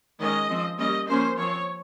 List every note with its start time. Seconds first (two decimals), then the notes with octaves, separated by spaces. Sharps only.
0.19 D#3 G#3 C#4 D#5
0.49 F3 C4
0.78 G3 A#3 C#4 D#5
1.08 F3 A#3 C#4 C5
1.37 F3 C4 C#5